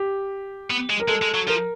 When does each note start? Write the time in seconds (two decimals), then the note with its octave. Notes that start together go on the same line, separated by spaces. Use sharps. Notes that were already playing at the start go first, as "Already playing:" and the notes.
Already playing: G4
0.70 B3
0.90 G#3
1.00 A#4
1.08 G#3 A4
1.22 G#3
1.34 F#3
1.47 F3 A#4